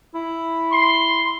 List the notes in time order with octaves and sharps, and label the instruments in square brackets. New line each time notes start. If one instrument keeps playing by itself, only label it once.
[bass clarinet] E4
[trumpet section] C6